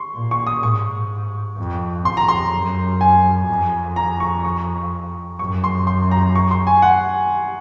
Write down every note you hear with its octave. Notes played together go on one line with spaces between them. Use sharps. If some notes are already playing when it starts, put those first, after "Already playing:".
Already playing: C6 C#6
A#2
C#6
D#6
G#2 C#6
F2
F2 C6
A#5
C6
F#2
G#5
F2
A#5
C#6
C#6
F#2 C#6
C6
C6
A#5
C#6
C6
G#5
F#5